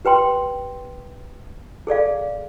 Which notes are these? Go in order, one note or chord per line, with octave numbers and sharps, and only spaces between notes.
G4 B4 G5 C6
G#4 A4 D5 F5